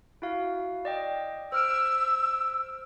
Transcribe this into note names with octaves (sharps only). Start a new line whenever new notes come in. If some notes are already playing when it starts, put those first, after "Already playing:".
E4 F#4 F5
D5 D#5 G5
C5 E6 F6 D7